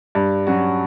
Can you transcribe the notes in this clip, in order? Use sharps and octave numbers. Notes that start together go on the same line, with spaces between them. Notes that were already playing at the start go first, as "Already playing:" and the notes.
G2
F#3 C#4 F#4